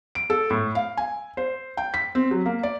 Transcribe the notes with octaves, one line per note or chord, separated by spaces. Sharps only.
D7
A4
A2
F5
G#5
C5
G5
B6
C4
F#3
A#3
D5